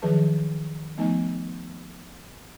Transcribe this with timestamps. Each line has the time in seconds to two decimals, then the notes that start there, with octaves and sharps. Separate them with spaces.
0.02 D#3 F3 F#3 G#4 B4 A5
0.98 F3 A3 B3 D#4 D#5 G#5